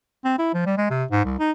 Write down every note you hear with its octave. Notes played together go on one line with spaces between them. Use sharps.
C4
E4
F3
G3
G#3
C3
G#2
C2
D#4